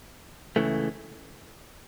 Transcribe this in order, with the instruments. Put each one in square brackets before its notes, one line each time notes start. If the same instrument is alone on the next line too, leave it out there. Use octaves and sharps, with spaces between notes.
[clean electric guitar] C#2 C#3 E3 A3